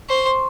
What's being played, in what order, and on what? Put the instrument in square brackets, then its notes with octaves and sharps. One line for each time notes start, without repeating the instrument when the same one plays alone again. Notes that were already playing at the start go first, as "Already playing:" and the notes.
[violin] C5 [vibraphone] C#6
[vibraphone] C6